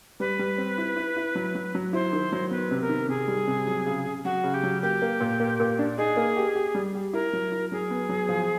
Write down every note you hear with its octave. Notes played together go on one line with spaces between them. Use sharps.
G3 B4
G3
C4
E4
E4
E4
F#3
F#3
F#3
E4 C5
D#3
F#3
B3 B4
C3
A#4
D#3
C3 G#4
G3
C3
F#3
C#3
C#3
F#3 F#4
C#3
G4
F#3
A#3 G4
A#3
A#2
A#3
A#2
D4
D#4 G#4
A#3
G4
G4
G3
G4
E4 A#4
F#3
E4
F#3 G#4
B3
F#3
F3